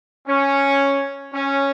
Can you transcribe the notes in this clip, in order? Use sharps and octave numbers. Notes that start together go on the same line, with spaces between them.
C#4
C#4